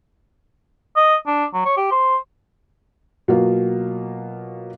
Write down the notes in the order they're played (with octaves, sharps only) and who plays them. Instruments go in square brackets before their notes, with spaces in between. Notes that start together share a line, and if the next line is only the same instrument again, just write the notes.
[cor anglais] D#5
D4
F#3
C#5
G4
C5
[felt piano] B2 F#3 A#3 F4